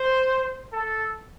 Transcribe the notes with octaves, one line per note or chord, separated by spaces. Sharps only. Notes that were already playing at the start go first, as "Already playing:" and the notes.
Already playing: C5
A4